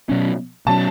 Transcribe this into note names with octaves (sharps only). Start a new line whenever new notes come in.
B2 F#3 C#4
B2 F#3 C#4 A5